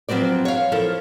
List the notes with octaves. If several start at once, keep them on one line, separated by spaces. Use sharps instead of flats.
F3 F#3 B3 C4 D5
C#5 F5
F3 E4 A4 A#4